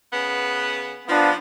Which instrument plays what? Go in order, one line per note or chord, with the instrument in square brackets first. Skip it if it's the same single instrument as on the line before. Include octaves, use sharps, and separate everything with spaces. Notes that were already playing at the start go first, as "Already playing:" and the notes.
[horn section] C#3 B3
[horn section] F3 [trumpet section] B3 D4